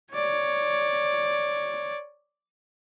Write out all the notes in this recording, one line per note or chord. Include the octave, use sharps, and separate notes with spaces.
C#5 D5